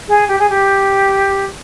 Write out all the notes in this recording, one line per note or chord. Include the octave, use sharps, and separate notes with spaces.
G#4
G4
G#4
G4